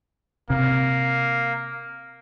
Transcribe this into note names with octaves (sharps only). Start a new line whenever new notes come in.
C3 A#3